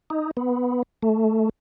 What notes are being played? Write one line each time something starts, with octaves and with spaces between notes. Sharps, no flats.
D#4
B3
A3